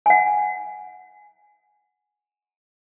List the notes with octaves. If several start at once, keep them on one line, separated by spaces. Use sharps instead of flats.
F#5 G#5